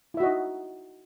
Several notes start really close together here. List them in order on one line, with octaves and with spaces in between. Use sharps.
E4 E5 F#4 D#5 D#4